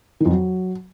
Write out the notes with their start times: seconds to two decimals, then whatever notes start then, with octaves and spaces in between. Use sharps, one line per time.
0.20 D#3
0.25 F2
0.30 F#3